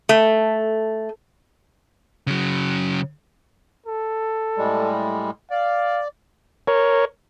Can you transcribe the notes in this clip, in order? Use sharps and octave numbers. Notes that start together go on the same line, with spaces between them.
A3
C#3 F#3
A4
A2 G3 G#3
D5 F5
A#4 C#5